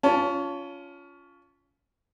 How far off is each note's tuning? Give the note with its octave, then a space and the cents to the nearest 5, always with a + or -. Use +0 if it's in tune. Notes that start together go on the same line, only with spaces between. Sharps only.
C#4 +25 F4 +0 A5 +0